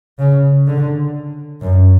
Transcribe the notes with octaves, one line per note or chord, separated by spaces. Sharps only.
C#3
D3
F#2